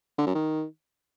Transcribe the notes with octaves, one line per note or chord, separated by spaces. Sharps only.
D3
F#2
D#3